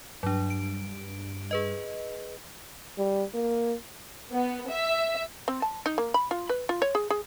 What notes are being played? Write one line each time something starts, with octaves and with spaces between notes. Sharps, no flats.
G2 F#3 D4
D7
G#4 B4 D#5
G3
A#3
B3
E5
C4
A5
D#4
A#3
B5
F4
B4
F4
C#5
G#4
G#4